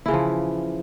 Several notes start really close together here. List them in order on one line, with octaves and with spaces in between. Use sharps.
E4 C#3 E3 F3